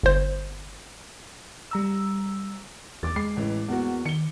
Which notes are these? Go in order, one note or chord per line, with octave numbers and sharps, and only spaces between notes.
G1 C5
G3 A#5 E6
E2 D6 A6
G#3 C7
A1 E3
E2 A#3 F#4
D#3 C#7 G7